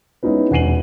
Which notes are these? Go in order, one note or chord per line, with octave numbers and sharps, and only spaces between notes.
G#3 B3 C#4 D#4 E4 B4
E1 F#5 G#5 C7 D#7 F#7